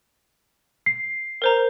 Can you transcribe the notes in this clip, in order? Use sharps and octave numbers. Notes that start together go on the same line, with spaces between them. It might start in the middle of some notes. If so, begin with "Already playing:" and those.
C7
A#4 C5 A#5